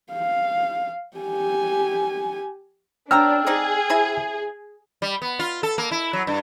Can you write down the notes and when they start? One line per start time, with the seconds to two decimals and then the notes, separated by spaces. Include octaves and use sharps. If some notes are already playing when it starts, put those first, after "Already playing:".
0.12 F5
1.17 G4 G#5
3.11 B2 D4 C#5 G5 A#5 E6 F6
3.47 C4 D#4 G#4 D5
3.90 C3 E4 G#5
5.02 G3
5.22 B3
5.39 F4
5.63 A4
5.78 A#3
5.91 E4
6.13 F#3
6.27 G2